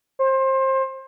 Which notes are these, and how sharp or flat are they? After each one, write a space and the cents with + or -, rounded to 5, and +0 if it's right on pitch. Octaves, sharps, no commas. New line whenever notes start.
C5 +25